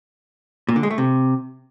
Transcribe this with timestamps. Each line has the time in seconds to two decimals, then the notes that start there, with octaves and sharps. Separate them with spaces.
0.69 A#2
0.76 D3
0.83 G#3
0.91 A3
0.98 C3